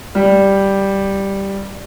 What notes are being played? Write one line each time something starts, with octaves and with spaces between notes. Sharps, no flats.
G3